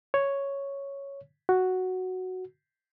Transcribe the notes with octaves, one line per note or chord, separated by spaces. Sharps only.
C#5
F#4